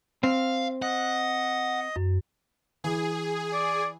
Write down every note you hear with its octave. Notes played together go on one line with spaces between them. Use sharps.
C4 F5
D#5 F#5
F#2
E3 G#4
D5